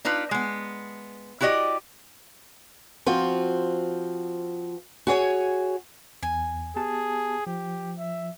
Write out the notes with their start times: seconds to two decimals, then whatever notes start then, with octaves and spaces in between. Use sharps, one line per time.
0.05 D4 D#4 F4 B4
0.31 G#3 B3
1.41 E4 F#4 G4 D5 D#5
3.06 F3 C4 F4 F#4
5.07 F#4 G#4 C#5 G#5
6.23 E2 G#5
6.76 B3 G4 G#4 A5
7.47 F3 G4
7.99 E5